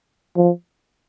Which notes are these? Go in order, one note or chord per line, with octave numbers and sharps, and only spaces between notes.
F3